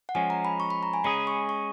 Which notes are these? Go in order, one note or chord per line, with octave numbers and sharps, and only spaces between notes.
F#5
F3 G#3 C#4 G#5
A#5
B5
C#6
B5
A#5
G#5
G#3 C#4 G#4 B5
C#6
C#6